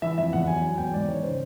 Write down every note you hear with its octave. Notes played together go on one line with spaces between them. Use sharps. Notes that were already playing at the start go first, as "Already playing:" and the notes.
E3 E5
F2 E5
E2 F#5
F#3 G#5
F#3 G#5
E2 G5
G#2 D5
D#3 C#5
C#3 C5